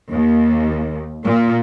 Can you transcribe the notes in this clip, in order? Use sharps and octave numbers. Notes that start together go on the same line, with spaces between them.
D#2
A#2